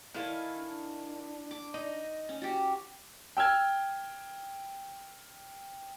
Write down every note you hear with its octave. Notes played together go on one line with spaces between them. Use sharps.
D#3 E4 A4 F5 G#5
D4
D6
D#4 D#5
C#4
F#4 G4
G5 E6 F6 G#6